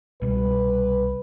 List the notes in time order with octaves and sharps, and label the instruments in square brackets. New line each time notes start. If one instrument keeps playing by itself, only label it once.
[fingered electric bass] C2 B2 G3 [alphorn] B4